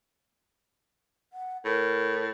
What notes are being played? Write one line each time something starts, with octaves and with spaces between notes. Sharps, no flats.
F#5
A2 A#4